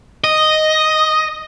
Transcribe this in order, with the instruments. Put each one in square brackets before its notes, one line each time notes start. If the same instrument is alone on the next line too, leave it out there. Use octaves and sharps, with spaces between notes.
[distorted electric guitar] D#5